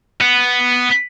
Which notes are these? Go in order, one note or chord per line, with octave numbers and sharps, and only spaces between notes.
B3